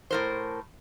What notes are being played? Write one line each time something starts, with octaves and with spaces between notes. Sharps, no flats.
A2 A#4 C5